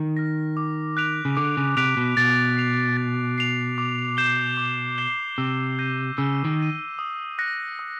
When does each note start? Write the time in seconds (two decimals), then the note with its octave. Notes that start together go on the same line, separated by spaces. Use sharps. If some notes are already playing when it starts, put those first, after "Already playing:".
Already playing: D#3
0.17 F6 A#6
0.57 D6
0.97 F#6 B6 D7 F7
1.25 C#3
1.37 D3 D6
1.57 C#3
1.77 C3 F#6 B6 D7 F7
1.97 B2
2.17 B2 A6
2.57 C7 F7
2.97 A6
3.38 C7 F7
3.78 D6
4.17 G6 C7 E7 G7
4.57 D6
4.98 G6 C7 E7 G7
5.38 C3 E6
5.79 G6 A#6 D#7
6.18 C#3 E6
6.45 D#3
6.58 G6 A#6 D#7
6.99 D#6
7.38 F#6 A#6 C#7
7.79 D#6